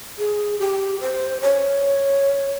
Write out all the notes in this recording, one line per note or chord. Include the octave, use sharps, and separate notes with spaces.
G#4
G4
C5
C#5